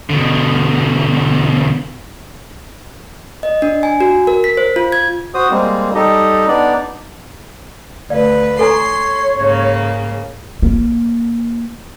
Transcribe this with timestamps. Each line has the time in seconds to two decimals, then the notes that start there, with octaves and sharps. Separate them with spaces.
0.10 B2 D3
3.43 D#5
3.62 D4
3.83 G#5
4.00 F#4
4.27 A#4
4.44 B6
4.57 C5
4.76 F4
4.92 G#6
5.34 F#4 C5 D#6
5.51 G3 G#3 A#3 C4
5.95 G3 D#4 G4 A4 D#5
6.48 B3 D4 D#4 D5
8.10 D2 B4 D5 F5
8.59 A4 C#5 G#5 A#5 C6
9.36 G#2 C#3 A#3
10.62 A#3